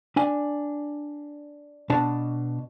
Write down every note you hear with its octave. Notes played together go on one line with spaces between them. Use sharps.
D4 G#5
B2 D4 A5